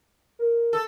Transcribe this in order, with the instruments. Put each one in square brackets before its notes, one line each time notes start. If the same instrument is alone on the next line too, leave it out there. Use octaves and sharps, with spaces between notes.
[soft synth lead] A#4
[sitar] A4